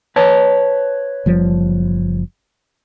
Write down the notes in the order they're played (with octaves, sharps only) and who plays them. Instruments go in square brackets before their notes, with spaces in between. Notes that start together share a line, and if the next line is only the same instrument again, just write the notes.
[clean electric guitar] B4 C#5 A5
[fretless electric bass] F#1 F3 G3